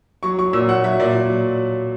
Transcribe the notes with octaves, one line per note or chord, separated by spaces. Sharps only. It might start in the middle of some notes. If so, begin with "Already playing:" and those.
F#3 C#6
F#3 C#6
A#2 E6
A#2 F#5
F#3 E5
A#2 D5
A#2
F#3